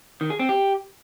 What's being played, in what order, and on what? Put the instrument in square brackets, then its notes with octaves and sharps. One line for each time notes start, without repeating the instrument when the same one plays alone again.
[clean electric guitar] D#3
G#4
C4
G4